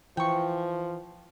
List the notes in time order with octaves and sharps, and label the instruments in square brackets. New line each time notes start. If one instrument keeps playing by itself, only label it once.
[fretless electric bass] E3 [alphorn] F3 [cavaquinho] G5 C#6